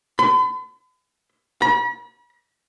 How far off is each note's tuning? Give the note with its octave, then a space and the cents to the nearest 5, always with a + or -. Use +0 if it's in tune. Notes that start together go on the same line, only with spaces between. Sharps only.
B5 +45
B5 -40